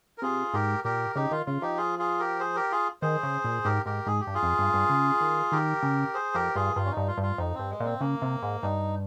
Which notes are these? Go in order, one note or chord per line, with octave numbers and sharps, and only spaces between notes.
A#4
C3 F4 G#4
G#2 G4 A#4
A#2 G4 A#4
C#3 D#4 G4
D#3 F4
C#3 F4
F3 D#4 G4
F4 G#4
F4 G#4
G4 A#4
G#4 C5
G4 A#4
F4 G#4
D#3 G#4 C5
C#3
A#2
G#2 G4 A#4
G#2 G4 A#4
G#2 G#4
G4
G2
F4 G#4
F2
G2
G2
C#3
D#3
D#3 G4 A#4
C#3
G#4 C5
F2 G4 A#4
G2 F4 G#4
G2 F4
C#4
D#4
G2
F4
G2
F4
F2 D#4
G2 C4
G#3
A#2 C4
C#3 A#3
C3
G#2
G2 D#4